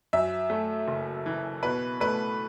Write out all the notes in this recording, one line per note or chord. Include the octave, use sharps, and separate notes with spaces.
F#2 E5
A3
F#1
E3
B2 B4
A3 B4